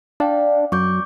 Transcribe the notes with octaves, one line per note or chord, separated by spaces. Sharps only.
D4 F5 G5
F#2 C#6 D6 G6